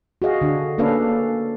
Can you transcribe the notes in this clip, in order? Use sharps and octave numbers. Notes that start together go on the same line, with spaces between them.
F#4 G#4 D#5 F5
D3 D4
A#3 C#4 D4 A4 B4 F5